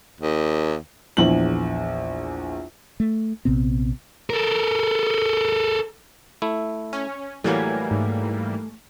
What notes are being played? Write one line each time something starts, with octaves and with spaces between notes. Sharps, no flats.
D#2
A#1 E2 F#7
A3
A#1 C3 B3 C4
A4 A#4
A3 E4
C#4
A2 E3 F#3 G3 A3 A#3 G#5
G#2